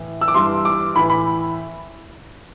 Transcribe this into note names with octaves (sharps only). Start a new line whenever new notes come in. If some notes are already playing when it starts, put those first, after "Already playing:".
Already playing: A2 E3
E6
D6
G2 E3 C6
D6
A2 E3 B5
B5